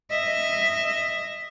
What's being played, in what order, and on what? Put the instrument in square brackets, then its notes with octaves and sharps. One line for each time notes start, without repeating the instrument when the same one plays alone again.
[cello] D#5 E5